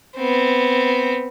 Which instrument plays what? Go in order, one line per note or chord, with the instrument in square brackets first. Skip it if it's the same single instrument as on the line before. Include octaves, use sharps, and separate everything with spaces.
[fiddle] B3 C4